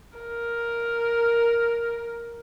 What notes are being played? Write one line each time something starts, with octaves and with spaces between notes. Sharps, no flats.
A#4